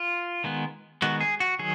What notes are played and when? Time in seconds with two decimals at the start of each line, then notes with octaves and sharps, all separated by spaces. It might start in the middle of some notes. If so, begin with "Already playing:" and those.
Already playing: F4
0.44 D#3 G#3 B3
1.02 D#3 G#3 B3 F#4
1.21 G#4
1.40 F#4
1.59 D#3 F#3 G#4